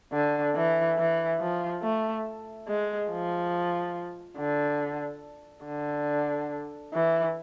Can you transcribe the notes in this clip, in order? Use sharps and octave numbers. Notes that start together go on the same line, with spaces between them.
D3
E3
E3
F3
A3
G#3
F3
D3
D3
E3